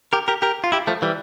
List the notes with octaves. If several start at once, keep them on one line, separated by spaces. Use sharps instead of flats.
G4 A#4
G4 A#4
G4 A#4
F4
E4 G4
F3 A3
E3 G3